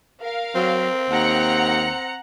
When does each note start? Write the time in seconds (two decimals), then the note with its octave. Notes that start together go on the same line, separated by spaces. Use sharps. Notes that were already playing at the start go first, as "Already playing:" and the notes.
0.22 A#4 F5
0.55 F#3 C4
1.10 D#2 F#5 A#5 C#7